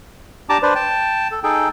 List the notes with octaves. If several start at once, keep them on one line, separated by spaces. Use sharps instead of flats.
D4 G4 A5 A#5 D6
D4 B4 C5 D5
G5 A5
A4
D#4 G#4 A4 G5